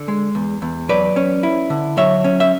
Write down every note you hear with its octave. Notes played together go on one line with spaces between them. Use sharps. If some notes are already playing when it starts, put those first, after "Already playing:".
Already playing: D3
G#3
E2
E2
F#3 B4 D5
C#4
E4
D3
F#3 C#5 E5
C#4
E5